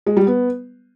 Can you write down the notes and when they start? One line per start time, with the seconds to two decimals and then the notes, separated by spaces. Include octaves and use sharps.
0.06 G#3
0.17 G3
0.27 B3